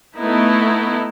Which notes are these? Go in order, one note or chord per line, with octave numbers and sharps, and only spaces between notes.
A3 B3 D#4 E4